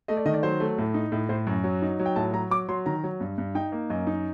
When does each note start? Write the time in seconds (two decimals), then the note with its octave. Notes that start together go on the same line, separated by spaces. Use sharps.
0.08 A3 D#5
0.17 D5
0.25 D#3 D#5
0.34 D5
0.43 F#3 C5
0.60 A3
0.78 A2
0.94 D#4
1.12 A2
1.29 A2 C5
1.47 F#2
1.64 F#3
1.82 D#4
1.99 F#3
2.06 G5
2.16 A2 A5
2.33 F#3 A#5
2.50 F#3 D6
2.68 F#3 C6
2.86 D#3 A#5
3.04 F#3
3.20 G2
3.38 G2
3.55 D#4 G5
3.72 A#3
3.90 F#2 D#5
4.07 D#4